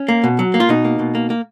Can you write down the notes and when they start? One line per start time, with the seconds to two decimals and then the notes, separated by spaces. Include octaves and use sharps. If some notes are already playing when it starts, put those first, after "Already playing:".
Already playing: C#4
0.08 A#3
0.24 B2
0.39 F#3
0.54 A#3
0.60 F4
0.69 B2 D#4
0.85 A#3
0.99 B2
1.15 A#3
1.30 A#3